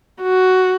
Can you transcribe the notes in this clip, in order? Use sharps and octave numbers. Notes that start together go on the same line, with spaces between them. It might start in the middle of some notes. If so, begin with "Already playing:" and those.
F#4